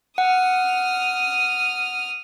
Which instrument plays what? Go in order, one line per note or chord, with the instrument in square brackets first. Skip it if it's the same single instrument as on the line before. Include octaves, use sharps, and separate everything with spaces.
[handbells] F#5 [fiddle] D#6 F6